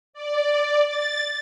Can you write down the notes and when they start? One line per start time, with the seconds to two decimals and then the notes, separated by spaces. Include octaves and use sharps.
0.13 D5
0.85 A6